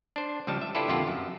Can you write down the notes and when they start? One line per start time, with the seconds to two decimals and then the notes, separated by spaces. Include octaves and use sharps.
0.16 D4 C5
0.47 C#2 F3 G3 A5
0.61 E5
0.75 D4 E4 F4 G4 A4 B4
0.88 F2 A#2 D3 F4 G4 F#5
1.08 F#2